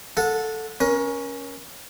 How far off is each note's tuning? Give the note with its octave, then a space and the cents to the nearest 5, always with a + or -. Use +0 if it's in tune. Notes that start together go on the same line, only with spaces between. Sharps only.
A4 +0 F#5 -25
C#4 +0 A#4 +30